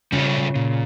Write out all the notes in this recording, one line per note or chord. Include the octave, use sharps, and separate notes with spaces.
C#3 G3 C#4 F4 A4
A#2